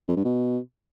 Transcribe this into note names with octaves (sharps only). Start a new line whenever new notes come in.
F2
G2
B2